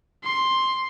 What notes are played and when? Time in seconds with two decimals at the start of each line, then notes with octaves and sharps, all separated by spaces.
0.23 C6